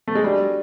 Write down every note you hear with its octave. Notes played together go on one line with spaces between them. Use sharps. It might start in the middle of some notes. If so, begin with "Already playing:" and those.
A3
G#3
G3 D4 F#4 A4 D5